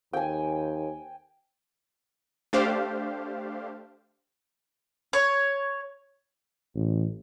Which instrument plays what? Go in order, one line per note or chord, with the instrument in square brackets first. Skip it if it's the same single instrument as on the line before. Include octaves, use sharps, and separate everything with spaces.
[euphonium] D#2 [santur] G5 G#5
[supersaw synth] A3 D4 G4 C5 F5
[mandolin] C#5
[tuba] A1